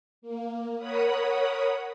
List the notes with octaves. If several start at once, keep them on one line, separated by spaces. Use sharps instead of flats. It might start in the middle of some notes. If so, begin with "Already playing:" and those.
A#3
A#4 C#5 F#5 B5 D#6